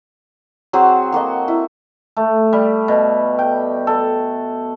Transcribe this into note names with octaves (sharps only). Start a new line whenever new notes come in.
F#3 C4 F#4 G#4
A#3 F#4 A4 D#5
E4
A3
G3
B2
G5
A4